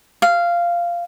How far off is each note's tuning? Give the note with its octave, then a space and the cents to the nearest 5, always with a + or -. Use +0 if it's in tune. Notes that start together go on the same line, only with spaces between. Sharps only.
F5 -10